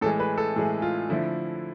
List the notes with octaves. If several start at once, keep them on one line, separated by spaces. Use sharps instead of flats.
A2 E3 G#3 A4
B4
A4
A2 E3 G#3 G#4
F4
D3 F3 A3 E4